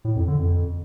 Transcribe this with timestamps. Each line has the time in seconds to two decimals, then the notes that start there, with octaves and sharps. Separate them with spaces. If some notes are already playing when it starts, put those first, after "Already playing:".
0.05 A2
0.16 F2
0.28 D3
0.39 F2